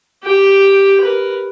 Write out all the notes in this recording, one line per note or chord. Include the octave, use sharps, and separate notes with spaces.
G4 G5
A#4 B4